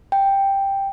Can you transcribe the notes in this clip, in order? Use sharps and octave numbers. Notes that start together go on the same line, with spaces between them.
G5